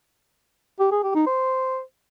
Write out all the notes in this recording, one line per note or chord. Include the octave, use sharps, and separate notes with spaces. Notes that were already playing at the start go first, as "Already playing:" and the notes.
G4
G#4
G4
D#4
C5